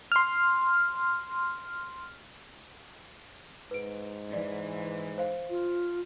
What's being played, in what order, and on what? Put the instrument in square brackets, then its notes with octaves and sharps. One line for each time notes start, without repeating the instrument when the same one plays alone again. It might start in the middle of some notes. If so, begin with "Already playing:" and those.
[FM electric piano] C6 F6
[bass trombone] G#2 [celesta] B4 D7
[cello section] E3 [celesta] D5
[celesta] C5 F5
[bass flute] F4